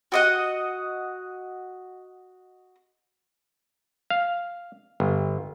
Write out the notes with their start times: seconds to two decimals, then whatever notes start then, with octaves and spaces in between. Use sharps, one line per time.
0.12 F#4 D#5 F#5
4.10 F5
5.00 G1